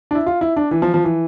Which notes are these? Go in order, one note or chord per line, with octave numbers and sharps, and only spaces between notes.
D4
E4
F4
E4
D4
E3
F3
F3
E3